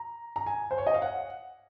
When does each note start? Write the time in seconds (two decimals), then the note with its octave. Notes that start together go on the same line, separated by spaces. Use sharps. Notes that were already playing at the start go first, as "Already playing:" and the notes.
Already playing: A#5
0.36 A#5
0.46 G#5
0.71 C5
0.78 C#5
0.86 D#5
0.94 F5
1.02 F#5